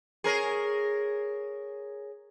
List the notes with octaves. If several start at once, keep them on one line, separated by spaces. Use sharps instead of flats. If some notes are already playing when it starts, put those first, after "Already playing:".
G#4 A#4 C#5